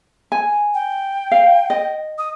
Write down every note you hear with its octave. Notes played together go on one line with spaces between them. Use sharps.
G#5
G5
F5
D#5
D#6